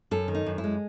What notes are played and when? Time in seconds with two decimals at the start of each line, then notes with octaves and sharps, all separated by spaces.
0.11 F#2 A4
0.28 D#3
0.34 D#4
0.46 F#2
0.58 E4
0.64 G#3